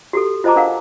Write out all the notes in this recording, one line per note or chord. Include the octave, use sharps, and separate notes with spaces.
F#4 G4 A4
F4 C5 D#5 A5 A#5 D6
D4 A#4 F5 F#5